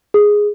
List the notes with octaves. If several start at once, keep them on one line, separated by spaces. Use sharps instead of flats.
G#4